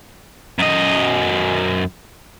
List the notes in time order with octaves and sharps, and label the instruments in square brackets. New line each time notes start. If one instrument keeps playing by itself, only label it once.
[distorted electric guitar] F#2 D#5